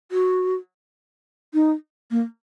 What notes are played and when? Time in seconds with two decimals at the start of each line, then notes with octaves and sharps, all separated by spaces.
0.12 F#4
1.54 D#4
2.11 A#3